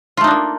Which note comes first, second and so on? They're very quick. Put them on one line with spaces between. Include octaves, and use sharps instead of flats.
F4 A3 D#4 D4 A#3